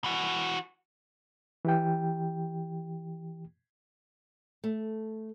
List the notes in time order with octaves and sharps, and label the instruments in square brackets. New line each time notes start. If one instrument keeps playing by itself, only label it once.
[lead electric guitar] E3 F#4
[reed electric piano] E3 G4 G5
[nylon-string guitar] A3